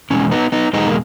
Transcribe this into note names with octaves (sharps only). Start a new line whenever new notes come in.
E2 B2 G#3 C#4
B3 D#4
B3 D#4
E2 B2 G#3 B3 D#4
A#3